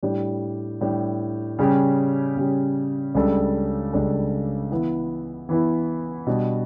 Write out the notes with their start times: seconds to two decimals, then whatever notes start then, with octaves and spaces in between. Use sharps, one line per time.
0.03 A2 G3 D4 G4
0.81 A2 G3 D4 G4
1.59 C#3 G3 C#4 G4
2.37 C#3 G3 C#4 G4
3.15 C#2 C#3 G3 D4 A4
3.93 C#2 C#3 G3 D4 A4
4.71 E3 B3 E4
5.49 E3 B3 E4
6.27 B2 G3 D4